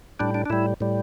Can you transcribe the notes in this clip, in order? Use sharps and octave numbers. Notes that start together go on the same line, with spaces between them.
A2 G3 D4
D4
D4
A2 G3 E4
A2 G3